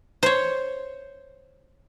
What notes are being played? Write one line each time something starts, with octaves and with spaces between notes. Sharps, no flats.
C5 C#5